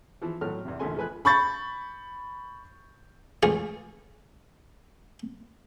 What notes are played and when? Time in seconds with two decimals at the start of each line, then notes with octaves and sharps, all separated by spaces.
0.22 E3 F3
0.41 A2 F#3 A3 F6
0.65 E2 C3
0.79 A#1 D#2 C#3 A3 G#5 C6
0.96 F3 A3 B4 G#5 F#6
1.25 B5 C#6 G6 A6
3.43 C#2 E3 A3 G#4 F5